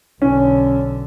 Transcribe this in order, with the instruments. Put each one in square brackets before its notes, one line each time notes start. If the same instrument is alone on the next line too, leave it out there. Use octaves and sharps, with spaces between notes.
[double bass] B1 D3 [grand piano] C#4